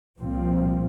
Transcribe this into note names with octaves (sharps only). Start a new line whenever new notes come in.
C2 A#2 F3 C4